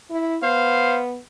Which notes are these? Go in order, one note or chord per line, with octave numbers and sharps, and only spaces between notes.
E4
B3 C5 F5